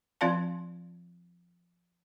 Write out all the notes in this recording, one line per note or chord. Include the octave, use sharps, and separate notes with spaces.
F3 C4 F4 D5 F5 A5